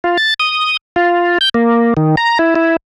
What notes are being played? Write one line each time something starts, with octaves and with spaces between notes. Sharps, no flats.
F4
A6
D#6
F4
G6
A#3
D#3
A#5
E4
E4